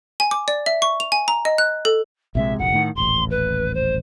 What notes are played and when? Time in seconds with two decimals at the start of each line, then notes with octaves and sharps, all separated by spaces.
0.20 G#5
0.31 D6
0.48 D5
0.66 E5
0.82 C#6
1.00 F7
1.12 G#5
1.28 A#5
1.45 D#5
1.58 F#6
1.85 A4
2.35 A#1 C3 G#3 E5
2.59 F1 A#1 F#5
2.74 A2 D#3
2.95 D#1 A1 C6
3.30 B4
3.74 C5